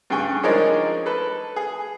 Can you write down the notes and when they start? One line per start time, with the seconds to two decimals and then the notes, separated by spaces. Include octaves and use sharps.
0.10 G2 C#3 G5 G#5 C#6
0.43 F3 G#3 D4 D#4 A#4 C#5
1.06 A4 B4
1.56 G#4